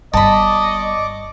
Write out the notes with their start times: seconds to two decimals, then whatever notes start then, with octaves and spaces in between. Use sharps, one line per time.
0.13 G1 D5 D#5 A5 B5 C#6 D6